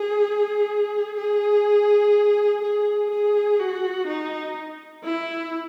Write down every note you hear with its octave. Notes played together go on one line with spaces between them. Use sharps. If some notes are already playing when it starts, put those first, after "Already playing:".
Already playing: G#4
G#4
G#4
G#4
F#4
D#4
E4